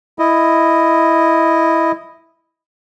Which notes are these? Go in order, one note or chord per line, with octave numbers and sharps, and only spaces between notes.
E4 D#5